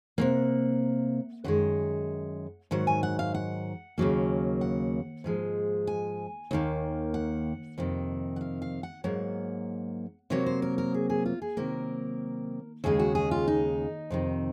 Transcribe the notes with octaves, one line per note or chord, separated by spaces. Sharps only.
C3 D#3 A#3 F#5
F#2 D#3 G#3 F#5
G#2 D#3 F#3 F#5
G#5
F#5
F5
F#5
D#2 C#3 F#3 A#3
F#5
G#2 F3 G#3
G#5
D#2 D#3 A#3
F#5
F2 C3 D#3
F#5
F5
F5
F#5
G#2 F#3 A#3 F#5
C3 F#3 A#3 C#5
C5
A#4
A#4
G#4
G#4
F4
G#4
C3 D#3 F#3 A#3 A#4
D#2 C#3 G#3 G#4
F#4
G#4
F4
D#4
F2 C3 D#3